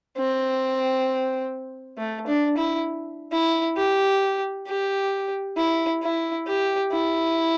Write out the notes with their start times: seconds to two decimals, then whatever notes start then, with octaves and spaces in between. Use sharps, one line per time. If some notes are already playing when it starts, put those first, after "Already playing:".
0.17 C4
1.98 A3
2.27 D4
2.57 E4
3.32 E4
3.77 G4
4.67 G4
5.57 E4
6.02 E4
6.47 G4
6.92 E4